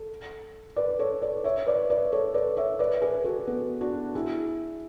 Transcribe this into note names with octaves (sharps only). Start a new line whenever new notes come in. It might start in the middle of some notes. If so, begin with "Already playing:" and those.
Already playing: A4
B4 D5
A4 C#5
B4 D5
C#5 E5
B4 D5
B4 D5
A4 C#5
B4 D5
C#5 E5
B4 D5
G#4 B4
F#4 A4
B3
D4 F#4
E4 G#4